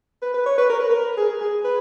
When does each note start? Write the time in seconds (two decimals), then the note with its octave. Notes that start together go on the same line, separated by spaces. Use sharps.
0.22 B4
0.34 B4
0.46 C#5
0.58 B4
0.70 A#4
0.80 B4
0.90 A#4
1.17 G#4
1.41 G#4
1.64 B4